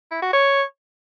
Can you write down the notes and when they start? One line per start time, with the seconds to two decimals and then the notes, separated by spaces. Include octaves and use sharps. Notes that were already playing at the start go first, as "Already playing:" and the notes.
0.11 E4
0.22 F#4
0.33 C#5